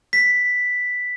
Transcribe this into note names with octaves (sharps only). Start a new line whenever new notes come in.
B6